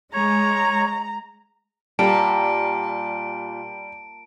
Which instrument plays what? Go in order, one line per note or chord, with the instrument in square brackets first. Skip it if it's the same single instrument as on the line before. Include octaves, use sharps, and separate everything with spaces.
[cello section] G#3 [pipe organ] C#5 [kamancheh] A#5
[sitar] A#2 [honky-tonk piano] G3 [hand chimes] A5 [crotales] D7